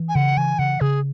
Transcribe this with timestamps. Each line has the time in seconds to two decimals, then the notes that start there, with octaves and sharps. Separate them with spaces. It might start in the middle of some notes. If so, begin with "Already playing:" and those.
Already playing: E3
0.09 G#5
0.15 C#3 F#5
0.37 E3 G#5
0.59 C#3 F#5
0.81 C#3 G#4